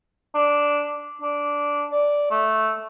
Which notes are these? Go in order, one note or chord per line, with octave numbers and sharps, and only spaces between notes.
D4
D4
D5
A3